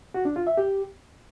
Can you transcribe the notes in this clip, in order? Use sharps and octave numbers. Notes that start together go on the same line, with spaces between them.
F#4
D4
F4
E5
G4